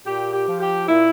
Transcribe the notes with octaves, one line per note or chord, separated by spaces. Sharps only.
A#2 G4
G4
F3
G4
A#2 E4